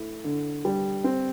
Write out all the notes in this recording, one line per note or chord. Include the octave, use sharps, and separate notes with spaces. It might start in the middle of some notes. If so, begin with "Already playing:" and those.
Already playing: A3 E4
D3
G3
C4